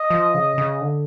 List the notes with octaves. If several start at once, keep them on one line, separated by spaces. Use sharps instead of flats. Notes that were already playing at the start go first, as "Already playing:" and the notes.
Already playing: D#5
F3
C#3
C#3
D3